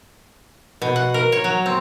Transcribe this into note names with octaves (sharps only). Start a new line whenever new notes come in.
B2
F#5
A#4
C#5
F#3
C4